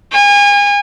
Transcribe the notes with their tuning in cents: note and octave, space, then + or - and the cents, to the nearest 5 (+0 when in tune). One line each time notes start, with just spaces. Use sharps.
G#5 -35